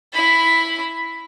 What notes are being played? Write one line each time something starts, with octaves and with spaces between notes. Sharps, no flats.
E4 B5